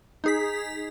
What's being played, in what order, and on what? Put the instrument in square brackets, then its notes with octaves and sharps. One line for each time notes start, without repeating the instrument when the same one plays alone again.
[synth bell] D#4 G#4 B6